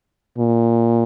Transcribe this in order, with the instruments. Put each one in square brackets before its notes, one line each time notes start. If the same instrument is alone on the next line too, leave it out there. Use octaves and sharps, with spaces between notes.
[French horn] A#2